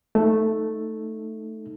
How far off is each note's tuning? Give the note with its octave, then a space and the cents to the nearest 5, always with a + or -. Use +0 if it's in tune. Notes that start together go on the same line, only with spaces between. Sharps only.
A3 +0 D#4 +0